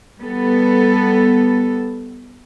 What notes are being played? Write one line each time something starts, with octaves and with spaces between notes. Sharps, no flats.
G3 B3 A4